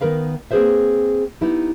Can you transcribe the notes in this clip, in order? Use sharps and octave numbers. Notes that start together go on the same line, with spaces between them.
D#3 B3 A#4 B4 F5
A#3 C4 G#4 B4 C5 E5
B3 D#4 E4 G4